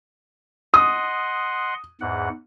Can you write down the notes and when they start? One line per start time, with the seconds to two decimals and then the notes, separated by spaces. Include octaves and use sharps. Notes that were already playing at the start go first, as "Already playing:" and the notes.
0.74 D#5 F#5 C6 D#6
2.01 E2 G#2 F#5